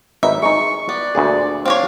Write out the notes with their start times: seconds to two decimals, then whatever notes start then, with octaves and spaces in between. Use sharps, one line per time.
0.23 G#1 D#4 B4 E5
0.42 G#3 D#4 C#6
0.89 B3 D5
1.15 D2 A#2 G#4
1.66 C4 D4 C#5 F5